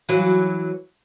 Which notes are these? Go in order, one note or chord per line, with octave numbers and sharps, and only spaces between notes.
E3 F#3